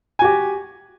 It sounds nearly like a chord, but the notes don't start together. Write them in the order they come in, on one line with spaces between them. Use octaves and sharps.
G#5 F#4 G4